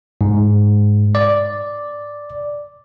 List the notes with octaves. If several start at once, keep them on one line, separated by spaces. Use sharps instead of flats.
G#2
D5